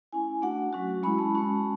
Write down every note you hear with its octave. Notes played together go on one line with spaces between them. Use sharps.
A3 C#4 E4 G#5
A3 D4 F#4 F#5
F#3 C#4 F#4
G#3 C#4 E4 B5
A5
G#3 C#4 F#4